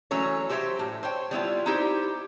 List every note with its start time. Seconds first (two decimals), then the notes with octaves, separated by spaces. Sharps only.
0.11 E3 F#3 A3 C#4 C#5
0.49 F#4 G4 C5 C#5 E5
0.79 A2
1.03 C5 C#5 G5
1.31 G3 B3 E4 F4
1.66 D#4 E4 G4 C5